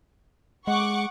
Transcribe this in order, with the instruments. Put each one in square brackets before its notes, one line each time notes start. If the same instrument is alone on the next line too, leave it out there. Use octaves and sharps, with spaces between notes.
[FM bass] G#3 [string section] F#5 C#6 D6